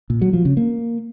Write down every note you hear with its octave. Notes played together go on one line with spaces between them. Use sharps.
A#2
F#3
F3
C#3
A#3